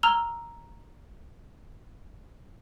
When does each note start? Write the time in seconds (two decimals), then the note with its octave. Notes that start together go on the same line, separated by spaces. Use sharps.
0.03 A#5 E6 F6 F7 G7